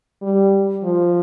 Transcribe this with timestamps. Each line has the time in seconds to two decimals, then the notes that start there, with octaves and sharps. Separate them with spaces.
0.22 G3
0.85 F3